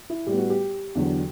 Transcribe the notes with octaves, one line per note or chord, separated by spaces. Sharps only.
E4
A2 G3 B3 G4
F#4
G4
E2 D3 F#3